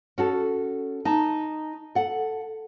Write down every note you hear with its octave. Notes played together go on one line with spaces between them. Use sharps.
C#4 F#4 A4
D#4 A5
A4 F#5